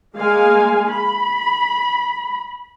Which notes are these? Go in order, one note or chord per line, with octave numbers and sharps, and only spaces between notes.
G#3 A#3 F5 G#5
B5